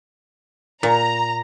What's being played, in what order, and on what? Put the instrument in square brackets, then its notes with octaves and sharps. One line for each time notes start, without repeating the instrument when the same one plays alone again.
[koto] A#2 [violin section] A#5